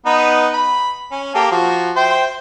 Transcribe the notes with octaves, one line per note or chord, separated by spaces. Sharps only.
B3 D#4 B4
B5
C#4
A#3 G4 A4
F3 F#4
C5 E5 G5